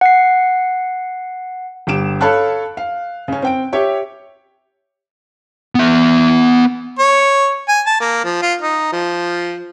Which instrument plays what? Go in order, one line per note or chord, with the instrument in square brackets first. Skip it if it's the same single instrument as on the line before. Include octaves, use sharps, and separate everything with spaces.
[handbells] F#5 C7
[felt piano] G1 G4 D7 E7
A4 C#5 F5 A5 B5 F#6
F5
C#3 C#4
C4 G5 D7
G4 C#5 E5
[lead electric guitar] B3 E5
[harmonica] C#5
G#5
A5
A#3
F3
F4
D#4
F3